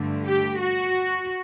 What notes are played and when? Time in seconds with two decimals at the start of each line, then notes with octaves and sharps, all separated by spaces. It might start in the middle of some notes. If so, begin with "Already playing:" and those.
Already playing: G2 D3 A3
0.25 G4
0.59 F#4